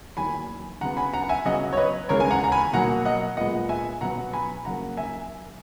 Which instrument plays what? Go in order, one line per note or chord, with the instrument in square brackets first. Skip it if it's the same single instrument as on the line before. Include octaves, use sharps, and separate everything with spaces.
[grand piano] E2 D#3 F#3 A#3 G#5 B5
C#3 F#3 B3 F#5 A#5
G#5 B5
F#5 A#5
F#5
E5 G#5
C#3 F#3 B3 D#5 F#5
C#5
B4 D#5
E2 C#3 G#3 B3 A#4 C#5
G#5
F#5 A#5
A#5
G#5 B5
B2 F#3 A#3 F#5 A#5
D#5 F#5
A#2 G#3 B3 D#5 F#5
E5 G#5
B2 F#3 B3 F#5 A#5
G#5 B5
C#3 F#3 A#3 F#5 A#5
E5 G#5